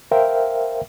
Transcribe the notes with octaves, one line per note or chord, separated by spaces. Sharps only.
A#4 C5 E5 F5 G5